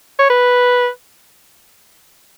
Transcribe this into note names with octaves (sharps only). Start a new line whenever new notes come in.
C#5
B4